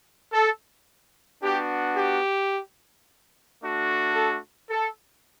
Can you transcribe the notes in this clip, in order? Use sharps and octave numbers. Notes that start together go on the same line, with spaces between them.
A4
B3 D4 F#4 G4
G4
A3 D4 F#4
A4
A4